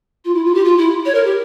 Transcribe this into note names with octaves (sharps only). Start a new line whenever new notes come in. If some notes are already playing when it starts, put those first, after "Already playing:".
F4
E4
F4
G4
F4
E4
C#5
A#4
G4